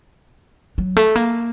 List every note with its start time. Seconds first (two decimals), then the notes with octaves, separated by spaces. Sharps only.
0.78 F#3
0.97 A3
1.16 A#3